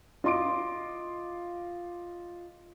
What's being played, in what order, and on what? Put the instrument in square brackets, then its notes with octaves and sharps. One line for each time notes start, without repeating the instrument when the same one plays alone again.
[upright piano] F4 D#5 C6 D6 D7